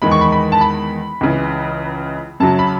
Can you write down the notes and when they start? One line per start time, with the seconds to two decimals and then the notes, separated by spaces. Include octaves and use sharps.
0.02 E2 D#3 G#3 B5
0.12 C#6
0.21 B5
0.32 B5
0.52 A5
0.61 B5
1.21 C#2 C#3 E3
2.40 F#2 C#3 F#3 A5
2.59 B5